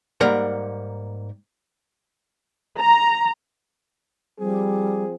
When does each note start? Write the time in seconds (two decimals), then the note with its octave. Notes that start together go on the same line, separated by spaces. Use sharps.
0.21 G#2 G3 A#3 A#4 F#5
2.79 A#5
4.39 F3 G3 C4 G#4